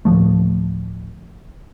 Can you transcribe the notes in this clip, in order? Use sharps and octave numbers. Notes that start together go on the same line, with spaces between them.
D1 G1 F3 A3